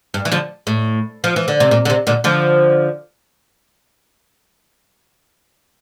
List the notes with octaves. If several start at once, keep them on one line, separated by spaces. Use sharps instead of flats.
G2
E3
D3 F3
A2
F3
E3
D3
C3
A#2
D3
C3
A#2 D3
D3 F3